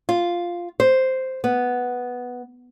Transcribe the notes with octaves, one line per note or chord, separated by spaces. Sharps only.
F4
C5
B3